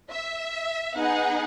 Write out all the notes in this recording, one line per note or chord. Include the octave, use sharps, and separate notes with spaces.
E5
B3 D#4 G#4 F#5